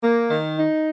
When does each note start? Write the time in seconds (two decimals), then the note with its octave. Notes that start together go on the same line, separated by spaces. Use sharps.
0.02 A#3
0.30 D#3
0.57 D#4